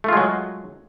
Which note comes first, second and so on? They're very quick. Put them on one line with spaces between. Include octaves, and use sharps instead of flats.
A3 F4 G#3 F#3